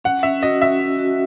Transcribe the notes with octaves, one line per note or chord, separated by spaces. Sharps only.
C#4 F#5
C#4 E5
F#4 D#5
C#4 E5
C#4
F#4